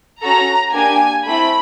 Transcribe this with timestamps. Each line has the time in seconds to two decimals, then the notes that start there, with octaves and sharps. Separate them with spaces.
0.22 C#4 F#4 A4 A#5
0.73 A#3 D4 G4 G#5
1.25 A3 C4 E4 B5